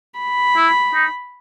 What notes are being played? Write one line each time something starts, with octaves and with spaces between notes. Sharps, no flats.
B5
E4
D#4